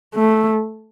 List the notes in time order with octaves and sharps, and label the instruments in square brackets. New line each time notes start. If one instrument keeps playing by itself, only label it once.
[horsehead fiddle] A3